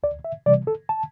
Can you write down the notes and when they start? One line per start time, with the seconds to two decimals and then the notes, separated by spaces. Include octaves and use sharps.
0.03 D2 D5
0.25 E5
0.46 C3 E3 G3 D5
0.67 A4
0.89 A5